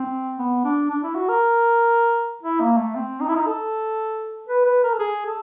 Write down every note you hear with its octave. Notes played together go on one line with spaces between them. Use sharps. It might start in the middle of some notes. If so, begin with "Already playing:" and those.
Already playing: C4
B3
D4
D4
E4
F#4
A#4
E4
A#3
A3
C4
D#4
E4
D#4
A4
B4
B4
A#4
A4
G#4
A4